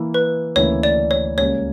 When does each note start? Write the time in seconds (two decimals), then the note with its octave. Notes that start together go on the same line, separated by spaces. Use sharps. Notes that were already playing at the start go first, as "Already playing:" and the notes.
Already playing: E3 A#3 E4
0.14 B4
0.56 D2 C#3 E3 A#3 E4 C#5
0.83 D5
1.11 C#5
1.38 C#2 C#3 G3 A#3 C#4 C#5